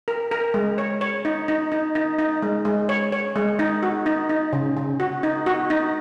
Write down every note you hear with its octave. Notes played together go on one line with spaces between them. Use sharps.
A#4
A#4
G#3
C#5
C#5
D#4
D#4
D#4
D#4
D#4
G#3
G#3
C#5
C#5
G#3
D#4
F#4
D#4
D#4
C#3
C#3
F#4
D#4
F#4
D#4